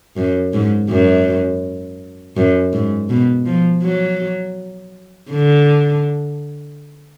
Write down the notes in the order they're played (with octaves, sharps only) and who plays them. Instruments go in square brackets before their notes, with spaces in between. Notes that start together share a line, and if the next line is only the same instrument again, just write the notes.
[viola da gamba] F#2
G#2
F#2
F#2
G#2
B2
F3
F#3
D3